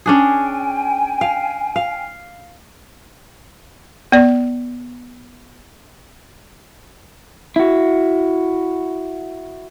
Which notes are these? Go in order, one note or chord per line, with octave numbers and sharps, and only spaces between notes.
C#4 D4 G#4 G5 G#5
F5
F5
B3 D5
E4 F#4